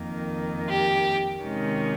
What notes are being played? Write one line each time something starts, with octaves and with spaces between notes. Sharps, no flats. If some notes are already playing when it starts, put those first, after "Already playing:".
Already playing: F2 D#3 A#3
G4
C3 D#3 G#3 C#4